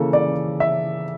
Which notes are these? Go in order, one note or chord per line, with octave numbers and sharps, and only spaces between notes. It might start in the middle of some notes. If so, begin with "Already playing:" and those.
Already playing: C#3 E3 A#3 A4
D5
E5